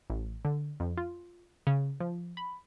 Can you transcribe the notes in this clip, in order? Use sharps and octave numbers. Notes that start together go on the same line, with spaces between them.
A1
D3
F2
F4
C#3
F3
B5